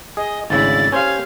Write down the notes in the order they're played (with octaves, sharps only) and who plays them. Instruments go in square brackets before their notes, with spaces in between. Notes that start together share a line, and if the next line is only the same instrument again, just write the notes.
[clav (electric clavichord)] G#4 [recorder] D#5
[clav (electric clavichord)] G#1 D2 C#3 [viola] E4 D5 [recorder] A6
[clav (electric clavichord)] C#4 C5 [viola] G4 F5 [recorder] G#6